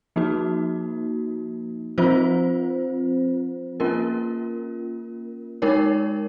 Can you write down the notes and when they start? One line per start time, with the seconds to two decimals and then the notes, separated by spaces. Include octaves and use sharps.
0.16 F3 A#3 D#4 F#4
1.98 F3 C4 F4 C5
3.80 A#3 C#4 F4 A#4
5.62 G#3 D#4 A#4 C#5